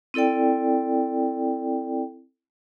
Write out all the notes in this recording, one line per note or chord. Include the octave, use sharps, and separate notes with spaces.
C4 E4 A4 D5 G5